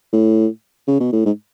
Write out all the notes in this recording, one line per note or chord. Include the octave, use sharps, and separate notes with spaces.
A2
C#3
B2
A2
G#2